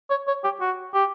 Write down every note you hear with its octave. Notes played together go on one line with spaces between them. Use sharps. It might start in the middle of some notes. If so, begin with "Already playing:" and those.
C#5
C#5
G4
F#4
G4